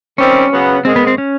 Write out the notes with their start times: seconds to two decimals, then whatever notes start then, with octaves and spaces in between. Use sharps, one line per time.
0.18 D#3 G3 C4 C#4
0.52 C#3 F#3 B3
0.85 G#2 D#3 G#3 C4
0.96 B3
1.07 C4
1.18 C#4